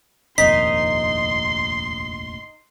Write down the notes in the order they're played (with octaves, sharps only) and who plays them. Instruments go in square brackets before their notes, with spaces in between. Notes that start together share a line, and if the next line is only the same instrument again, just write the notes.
[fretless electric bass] F1 A#1 D#2 [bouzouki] D#4 [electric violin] C6 [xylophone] B6